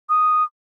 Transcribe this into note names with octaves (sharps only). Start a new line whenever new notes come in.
D#6